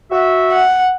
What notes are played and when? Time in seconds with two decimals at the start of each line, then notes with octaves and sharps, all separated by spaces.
0.11 F#4 E5
0.52 F#5